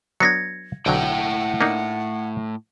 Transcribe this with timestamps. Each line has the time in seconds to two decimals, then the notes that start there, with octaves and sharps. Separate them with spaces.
0.20 F#3 B3 D4 G#6 A#6 C#7
0.86 B1 A2 D3 F#3 F#5 G5
1.61 A#3 D4 D#4